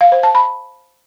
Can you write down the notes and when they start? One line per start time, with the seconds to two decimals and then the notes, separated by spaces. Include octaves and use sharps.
0.01 F5
0.12 C5
0.23 A5
0.35 B5